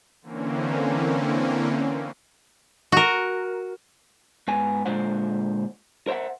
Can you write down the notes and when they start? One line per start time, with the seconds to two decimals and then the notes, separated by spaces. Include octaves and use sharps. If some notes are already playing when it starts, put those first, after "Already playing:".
0.22 D3 E3 A#3 C4 C#4
2.92 F#4 A#4
4.48 G#2 B3 G#5
4.86 A#2 D3 G#3 F4 C5 F#5
6.07 A#4 C5 D#5 E5 F#5